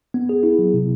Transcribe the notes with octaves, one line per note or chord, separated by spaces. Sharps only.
B3
G#4
E4
F#3
C3